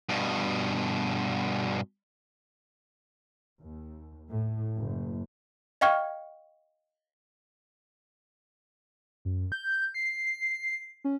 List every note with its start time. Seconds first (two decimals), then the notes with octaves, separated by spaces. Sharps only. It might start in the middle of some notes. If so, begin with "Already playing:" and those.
0.09 G2 B2
3.59 D#2
4.29 A2
4.77 F#1
5.81 D#5 F5 G5 C#6 F6 G#6
9.25 F#2
9.52 G6
9.94 C7
11.05 C#4